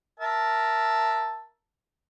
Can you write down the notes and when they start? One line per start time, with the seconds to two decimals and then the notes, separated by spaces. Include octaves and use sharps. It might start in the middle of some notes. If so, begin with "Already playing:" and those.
0.20 A#4 E5 A5